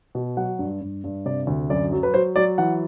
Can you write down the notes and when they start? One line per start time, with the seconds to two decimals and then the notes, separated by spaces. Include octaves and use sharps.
0.15 B2
0.37 F#3 F#5
0.59 G2
0.81 G2
1.04 G2
1.25 C3 D5
1.47 D2
1.70 F#2 D5
1.92 F#3
2.03 B4
2.14 F#3 C5
2.36 F#3 D5
2.58 E3 F#5